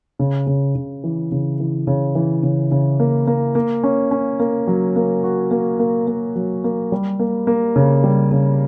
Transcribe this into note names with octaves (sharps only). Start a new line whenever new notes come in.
C#3
C#3
C#3
E3
C#3
E3
C#3
E3
C#3
C#3
A#3
A#3
A#3
C#4
C#4
A#3
F#3
A#3
F#4
A#3
A#3
A#3
F#3
A#3
G3
A#3
A#3
C#3
G3
C#3